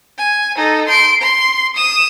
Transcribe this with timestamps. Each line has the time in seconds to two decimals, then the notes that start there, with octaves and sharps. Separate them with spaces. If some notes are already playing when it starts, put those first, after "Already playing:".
0.18 G#5
0.57 D#4 A4
0.88 C6 D7
1.22 C6
1.76 D#6 E7